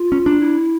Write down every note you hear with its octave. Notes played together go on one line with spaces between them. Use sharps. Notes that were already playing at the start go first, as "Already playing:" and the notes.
Already playing: F4
C#4
D4
E4